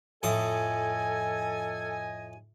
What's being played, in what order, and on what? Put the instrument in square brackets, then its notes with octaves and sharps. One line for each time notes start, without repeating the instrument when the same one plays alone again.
[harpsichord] F2 A2 D#6 [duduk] A4 [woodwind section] D#5 G#5